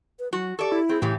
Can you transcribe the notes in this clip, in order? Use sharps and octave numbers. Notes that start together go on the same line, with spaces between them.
B4
F#3 F#4
G4 A4 D5 C#6
E4
C4 G#4
A2 C#3 E3 E4 G4